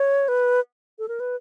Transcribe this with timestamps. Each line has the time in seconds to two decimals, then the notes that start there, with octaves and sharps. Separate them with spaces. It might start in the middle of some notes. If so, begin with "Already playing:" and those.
Already playing: C#5
0.28 B4
0.99 A4
1.08 A#4
1.20 B4